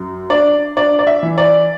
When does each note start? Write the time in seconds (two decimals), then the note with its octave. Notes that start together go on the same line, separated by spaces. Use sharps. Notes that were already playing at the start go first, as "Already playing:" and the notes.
Already playing: F#2
0.30 D4 D5
0.77 D4 D5
0.99 D5
1.07 E5
1.23 E3
1.38 D5